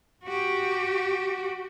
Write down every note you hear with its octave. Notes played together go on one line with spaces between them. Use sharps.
F#4 G4